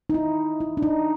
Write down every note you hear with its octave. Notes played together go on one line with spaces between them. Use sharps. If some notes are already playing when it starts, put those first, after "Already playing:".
D#4
E4
E4
D4
D#4